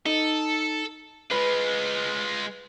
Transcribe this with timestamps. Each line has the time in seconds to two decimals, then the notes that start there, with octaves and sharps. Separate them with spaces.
0.06 D#4 A4
1.31 G#3 F4 B4